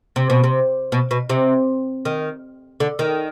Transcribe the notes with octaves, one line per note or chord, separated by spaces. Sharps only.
C3
B2
C3
B2
B2
C3
D#3
D3
D#3